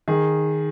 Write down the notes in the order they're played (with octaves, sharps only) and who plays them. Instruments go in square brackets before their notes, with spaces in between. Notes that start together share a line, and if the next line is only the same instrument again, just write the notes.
[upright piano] D#3 G#4